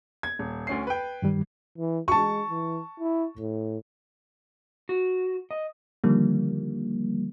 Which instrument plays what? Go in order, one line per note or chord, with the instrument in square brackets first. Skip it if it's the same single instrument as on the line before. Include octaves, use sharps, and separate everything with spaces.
[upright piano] G#6
D#1
D2 C#4 C7
B4 G5
[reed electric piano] G2 D#3 G3
[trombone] E3
[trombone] G#3 [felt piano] A5 C#6
[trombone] E3
E4
A2
[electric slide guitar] F#4
D#5
[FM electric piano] D3 D#3 F3 G3 A#3